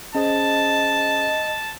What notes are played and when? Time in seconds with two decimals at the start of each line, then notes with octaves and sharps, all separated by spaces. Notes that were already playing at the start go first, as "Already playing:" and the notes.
0.15 C#4 G#4 C5 D#5 A5